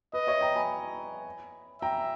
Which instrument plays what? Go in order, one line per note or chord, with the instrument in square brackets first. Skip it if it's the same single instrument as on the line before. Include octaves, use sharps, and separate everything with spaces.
[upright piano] B4 [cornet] D#5
[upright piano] C#5 E5
G5 A#5
G#5 B5
[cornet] E5 [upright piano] G5 A#5